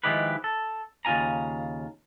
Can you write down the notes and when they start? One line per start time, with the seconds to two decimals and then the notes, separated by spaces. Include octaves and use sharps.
0.04 D#3 F3 G#3 E4 G4 B4
0.44 A4
1.05 D#2 C#3 F4 G#5 A#5